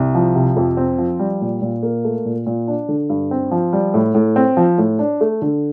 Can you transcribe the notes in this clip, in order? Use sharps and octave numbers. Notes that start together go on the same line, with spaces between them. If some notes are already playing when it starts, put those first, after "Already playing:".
Already playing: C2
F3
C3
F2
C4
F3
G3
A#2
A#2
A#3
A3
A#2
A#2
D4
D3
G2
C4
F3
G3
A2
A2
C4
F3
A2
D4
A3
D3